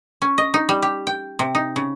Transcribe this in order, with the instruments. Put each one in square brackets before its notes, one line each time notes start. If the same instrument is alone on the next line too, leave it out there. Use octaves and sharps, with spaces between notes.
[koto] C#4
D#5
D#4
G3
G4
G5
C3
D#4
C#3